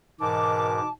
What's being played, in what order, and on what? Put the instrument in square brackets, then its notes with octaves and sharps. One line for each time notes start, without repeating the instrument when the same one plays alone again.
[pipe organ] G#2 [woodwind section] B2 E3 D6 [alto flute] A#4 [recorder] A5